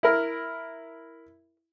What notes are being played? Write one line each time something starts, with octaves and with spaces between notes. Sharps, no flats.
E4 A#4